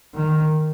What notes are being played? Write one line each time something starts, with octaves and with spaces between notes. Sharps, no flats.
D#3